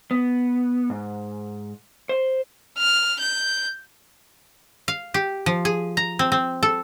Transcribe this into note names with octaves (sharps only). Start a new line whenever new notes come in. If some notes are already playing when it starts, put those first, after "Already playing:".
B3
G#2
C5
F6
G6
F5
G4
F3
G#4
A#5
C4
C4
A4